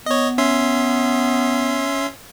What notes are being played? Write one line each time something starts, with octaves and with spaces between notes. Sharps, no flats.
B3 C#5 D#5
C#4 E5 C6